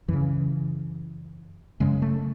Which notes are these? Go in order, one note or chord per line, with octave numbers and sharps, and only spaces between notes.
F#2 C#3 E3
F#2 C#3 G#3
A3